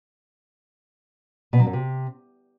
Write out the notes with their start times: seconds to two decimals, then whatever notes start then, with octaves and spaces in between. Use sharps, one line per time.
1.53 B2
1.60 F#3
1.67 F#2
1.73 C3